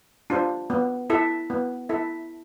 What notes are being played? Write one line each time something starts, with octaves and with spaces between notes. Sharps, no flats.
D4 F4 C5
B3
E4 A4 E5
B3
E4 A4 E5